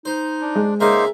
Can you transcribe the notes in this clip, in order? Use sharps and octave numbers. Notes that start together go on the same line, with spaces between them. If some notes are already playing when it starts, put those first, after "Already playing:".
D#4 C5
D4
G#3
C#3 A#3 D#4 A#4 C5 E5